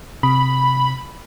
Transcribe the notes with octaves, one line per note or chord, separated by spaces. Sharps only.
C3 B5